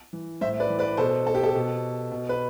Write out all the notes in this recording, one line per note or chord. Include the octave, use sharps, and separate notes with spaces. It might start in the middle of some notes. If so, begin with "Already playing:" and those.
E3
A2 C5 E5
B4 D5
E3
B4 D5
B2 A4 C5
A4
G4
A4
B2
B2
B4